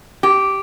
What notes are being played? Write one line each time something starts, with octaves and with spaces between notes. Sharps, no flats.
G4